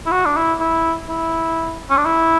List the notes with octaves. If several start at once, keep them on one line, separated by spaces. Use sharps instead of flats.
E4
F#4
D4
E4
E4
E4
C#4
D4
E4